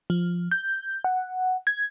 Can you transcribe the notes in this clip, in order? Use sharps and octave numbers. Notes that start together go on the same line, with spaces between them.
F3
G6
F#5
G#6